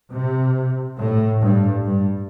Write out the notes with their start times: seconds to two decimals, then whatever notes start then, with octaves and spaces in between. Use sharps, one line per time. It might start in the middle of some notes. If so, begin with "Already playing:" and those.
0.12 C3
0.98 A2
1.41 G2
1.83 G2